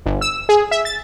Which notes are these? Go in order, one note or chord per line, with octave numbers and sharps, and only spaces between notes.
G1
E6
G#4
E5
A6